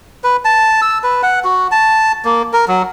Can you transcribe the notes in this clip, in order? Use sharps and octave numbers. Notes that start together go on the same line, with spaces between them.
B4
A5
E6
B4
F#5
F#4
A5
A#3
A#4
F#3